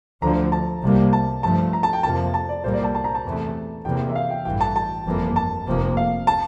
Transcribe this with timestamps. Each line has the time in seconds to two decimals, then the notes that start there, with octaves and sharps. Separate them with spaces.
0.22 D2 D3 F3 A#5
0.52 A5
0.82 C2 C3 G3 A#3
1.13 A5
1.43 G2 F3 A3 A5
1.73 A#5
1.83 A5
1.93 G5
2.03 F2 C3 F3 A#3 A5
2.34 A5
2.49 D5
2.64 C2 A#2 G3 A#3 C5
2.74 D5
2.84 A5
2.95 A5
3.04 A#5
3.15 A5
3.25 E2 C3 E3 A3
3.85 E2 C3 E3 A#3 G5
4.09 E5
4.15 F5
4.30 G5
4.45 A1 G2 E3 G5
4.61 A5
4.76 A5
5.06 G1 F2 E3 A#3
5.36 A5
5.66 F1 F2 C3 F3 A#3
5.97 F5
6.27 A5